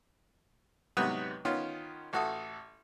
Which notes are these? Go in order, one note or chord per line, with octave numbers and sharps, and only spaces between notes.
G#2 C3 F#3 B3 B4 D#6
D#3 B3 C#4 F4
A1 F#4 A4 D#6